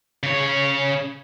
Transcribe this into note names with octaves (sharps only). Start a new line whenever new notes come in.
C#3 C#5